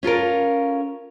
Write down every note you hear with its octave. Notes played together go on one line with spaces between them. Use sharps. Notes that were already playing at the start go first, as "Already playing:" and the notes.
C#4 F4 A4 A#4